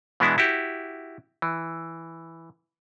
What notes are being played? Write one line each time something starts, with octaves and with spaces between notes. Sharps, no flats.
B2 E3 G#3 B3 D4 E4
E4 F#4 G4
E3